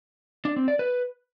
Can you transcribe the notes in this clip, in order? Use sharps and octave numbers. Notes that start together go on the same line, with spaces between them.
D4
C4
D5
B4